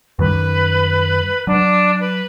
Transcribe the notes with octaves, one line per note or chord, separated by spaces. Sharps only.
F#2 D#3 G3 B4
F#3 D4
B4